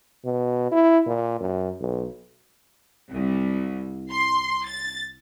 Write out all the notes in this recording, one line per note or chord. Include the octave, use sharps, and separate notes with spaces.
B2
E4
A#2
F#2
B1
C2
C6
A6